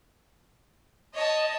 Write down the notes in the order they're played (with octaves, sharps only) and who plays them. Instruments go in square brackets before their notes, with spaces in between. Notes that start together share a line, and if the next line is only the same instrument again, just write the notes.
[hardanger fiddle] C#5 A5 [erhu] D#5